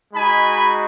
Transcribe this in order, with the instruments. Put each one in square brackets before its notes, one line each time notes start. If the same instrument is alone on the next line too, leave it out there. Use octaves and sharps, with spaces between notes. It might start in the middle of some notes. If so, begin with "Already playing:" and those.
[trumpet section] G#3 D#4 F#4 G#5 B5